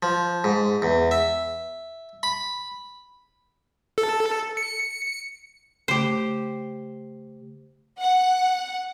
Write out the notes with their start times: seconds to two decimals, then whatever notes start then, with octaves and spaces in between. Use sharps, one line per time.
0.03 F3
0.44 G#2
0.82 E2
1.11 E5
2.23 B5
3.98 A4
4.57 C#7
5.88 C#3 A3 G4 C5
7.99 F#5